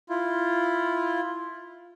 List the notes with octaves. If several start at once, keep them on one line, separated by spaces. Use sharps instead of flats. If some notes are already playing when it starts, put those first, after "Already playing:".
E4 F4